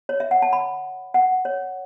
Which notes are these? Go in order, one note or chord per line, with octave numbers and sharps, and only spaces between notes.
C#5
E5
F#5
A5
B5
F#5
C#5